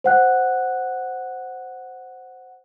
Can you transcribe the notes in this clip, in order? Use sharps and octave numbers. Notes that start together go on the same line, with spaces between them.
C5 F#5 F#6